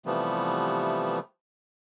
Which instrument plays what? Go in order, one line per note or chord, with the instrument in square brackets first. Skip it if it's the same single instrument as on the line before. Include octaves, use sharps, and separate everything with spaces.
[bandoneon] C3 E3 F3 G3 A3 B3